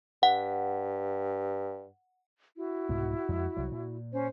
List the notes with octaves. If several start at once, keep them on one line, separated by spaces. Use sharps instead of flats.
G2 F#5
E4 F#4
C2 G#2 B2
F2 G#3
C2 F#3
A#2
C#4 C5